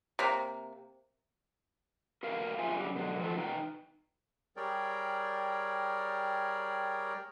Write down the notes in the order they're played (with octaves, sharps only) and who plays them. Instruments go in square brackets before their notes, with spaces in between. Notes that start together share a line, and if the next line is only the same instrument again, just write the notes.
[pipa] C3 A#3
[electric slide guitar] F#4 A#4 B4 F5
F4 G#4 C5 E5 G#5
G2 C#3 F#3 G3
B2 D3 F#3
F3 F#4 G#4 A4
D#4 B4 G5
[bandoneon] G3 G#4 A#4 C#5 D5 G5